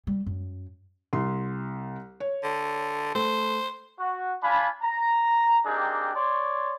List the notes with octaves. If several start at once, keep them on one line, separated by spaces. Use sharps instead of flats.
G3
F#2
C2 C6
C#5
D3
A3 C5
F#4
D4 F4 F5 G#5 B5
A#5
A#3 C4 D4 D#4 G4 G#4
C#5 D5 C6